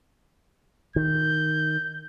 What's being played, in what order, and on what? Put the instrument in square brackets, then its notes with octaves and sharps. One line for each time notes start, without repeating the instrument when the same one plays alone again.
[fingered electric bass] D#3 [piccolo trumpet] G6